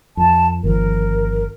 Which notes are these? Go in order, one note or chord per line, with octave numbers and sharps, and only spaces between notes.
F2 A5
G1 D#3 F3 A#4